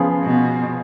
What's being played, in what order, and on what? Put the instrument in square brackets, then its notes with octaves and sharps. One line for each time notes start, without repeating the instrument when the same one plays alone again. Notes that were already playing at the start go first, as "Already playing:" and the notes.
Already playing: [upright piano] C#3 F3 B3 F4 G#4
[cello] B2